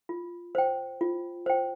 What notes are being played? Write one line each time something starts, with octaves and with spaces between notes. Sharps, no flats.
F4
C5 G5
F4
C5 G5